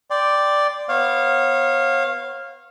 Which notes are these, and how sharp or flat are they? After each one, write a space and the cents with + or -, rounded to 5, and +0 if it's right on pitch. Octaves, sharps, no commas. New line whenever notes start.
D5 +0 G5 +0 C6 -15
B3 +0 C#5 -35 F5 +0